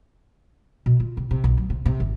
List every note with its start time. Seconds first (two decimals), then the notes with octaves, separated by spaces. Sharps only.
0.86 B2
1.00 F4
1.17 C3
1.31 C3
1.44 B1
1.57 F#3
1.70 C3
1.85 C3
2.00 G#1